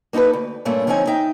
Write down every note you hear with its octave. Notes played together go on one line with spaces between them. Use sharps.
A#3 D#4 E4 A4 B4
D2
G2 A#2 A3 A#3 C#4
D3 F3 C4 C#4 D#4 G#5
D#4 E5 G5